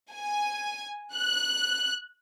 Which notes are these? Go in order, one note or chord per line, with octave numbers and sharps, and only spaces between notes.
G#5
F#6